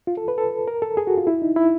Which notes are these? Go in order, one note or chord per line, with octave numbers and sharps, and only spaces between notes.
F4
A4
B4
A4
A#4
A4
G#4
F#4
F4
E4
D#4
E4